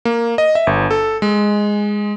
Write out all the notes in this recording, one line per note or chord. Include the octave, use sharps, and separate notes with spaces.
A#3
D#5
E5
G1
A4
G#3